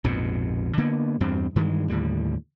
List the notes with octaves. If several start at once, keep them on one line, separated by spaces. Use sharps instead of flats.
A#1 F2 G#2 B2
D3 A#3 B3
E2 G2 C4
G2 D#3 E3 G#3
D#2 A2 D3 G3